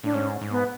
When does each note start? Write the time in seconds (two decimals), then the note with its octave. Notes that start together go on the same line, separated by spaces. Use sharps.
0.04 A2 D4
0.14 G#2 C#4
0.41 G#2
0.51 B3